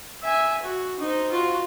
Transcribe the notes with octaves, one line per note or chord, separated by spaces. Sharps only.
E5 G#5
F#4
D#4 C5
F4 F#4